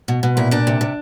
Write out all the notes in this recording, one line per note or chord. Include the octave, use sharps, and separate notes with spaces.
B2
B2
A#2 E4
A#2 D4
C3
C3